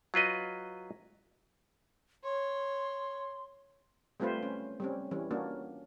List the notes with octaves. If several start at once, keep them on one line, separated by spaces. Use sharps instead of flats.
F#3 F4 B4 D#5
C#5 C6
G3 A3 C4 F4 B4 C5
C#4
G3 C4 C#4
E3 G3 C#4
A#3 C#4 D4 F#4